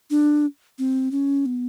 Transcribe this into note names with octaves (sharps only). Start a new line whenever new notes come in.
D4
C4
C#4
B3